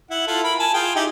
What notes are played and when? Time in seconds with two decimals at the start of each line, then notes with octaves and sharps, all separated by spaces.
0.10 E4 F#5
0.27 E4 F4 A4
0.44 A#4 B5
0.59 G#5 A5
0.74 F4 G#4 G5
0.95 D#4 E4 G4